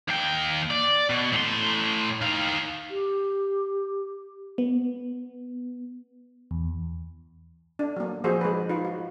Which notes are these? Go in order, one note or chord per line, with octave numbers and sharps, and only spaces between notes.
D#2 G5
D5
B2
A2 C6
D#3 F5
G4
B3
E2
D4
F#3 A#3
F3 F#4 G#4 C5
G#3 B4
D#4 F4 B4
F#4